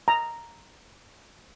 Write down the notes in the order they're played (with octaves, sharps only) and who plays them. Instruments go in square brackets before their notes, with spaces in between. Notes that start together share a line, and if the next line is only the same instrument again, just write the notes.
[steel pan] A#5